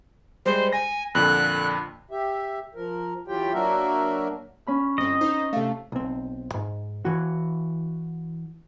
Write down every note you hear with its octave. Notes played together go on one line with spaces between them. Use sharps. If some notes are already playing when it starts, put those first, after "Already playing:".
G3 G#3 C5
G#5 A#6
F2 A#2 D3 F#6
G4 E5
F3 A#4
E3 F#3 F4 G4 G5
F#3 A#3 D4 F#4 A#4 E5
C#4 B5 F6
G1 C4 D#5
D#4 C5
C3 A3 A4 F5
B1 C4
G#2
E3 F#4